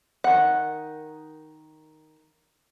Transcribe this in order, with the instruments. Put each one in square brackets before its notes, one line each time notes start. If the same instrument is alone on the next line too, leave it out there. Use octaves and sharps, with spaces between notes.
[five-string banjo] D#3 F#5